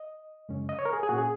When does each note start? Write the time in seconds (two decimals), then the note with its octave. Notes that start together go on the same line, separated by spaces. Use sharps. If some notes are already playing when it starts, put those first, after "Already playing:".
Already playing: D#5
0.49 F#2 C#3 G#3 C#4
0.69 D#5
0.79 C#5
0.85 A#4
0.93 G#4
1.03 G#4
1.09 A#2 A#3 C#4 F#4
1.18 G#4